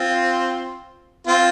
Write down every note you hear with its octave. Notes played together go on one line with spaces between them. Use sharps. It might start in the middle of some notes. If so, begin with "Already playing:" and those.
Already playing: C4 F4
C4 F4